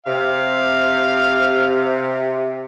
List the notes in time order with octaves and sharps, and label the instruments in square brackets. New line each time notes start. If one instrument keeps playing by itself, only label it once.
[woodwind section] C3 [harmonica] F5